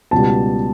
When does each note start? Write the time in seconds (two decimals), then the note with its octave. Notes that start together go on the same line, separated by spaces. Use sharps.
0.11 C#2 B2 G3 A5